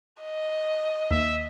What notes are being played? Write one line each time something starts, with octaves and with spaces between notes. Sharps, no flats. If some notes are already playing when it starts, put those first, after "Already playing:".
D#5
D#2 E5